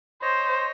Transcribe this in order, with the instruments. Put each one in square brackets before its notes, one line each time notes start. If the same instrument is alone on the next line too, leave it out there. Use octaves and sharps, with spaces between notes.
[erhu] C5 [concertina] C#5 D#5